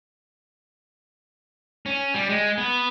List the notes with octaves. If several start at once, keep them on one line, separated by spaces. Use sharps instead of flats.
C#4
G3
G#3
B3